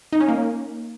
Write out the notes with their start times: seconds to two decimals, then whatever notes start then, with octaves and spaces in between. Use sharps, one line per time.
0.13 D#4
0.20 C#4
0.28 A#3